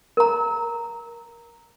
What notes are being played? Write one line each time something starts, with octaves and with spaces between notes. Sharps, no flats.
A#4 A#5